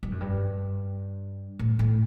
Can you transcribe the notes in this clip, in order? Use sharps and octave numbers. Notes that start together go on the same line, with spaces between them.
G2
F#2
G2
A2
A2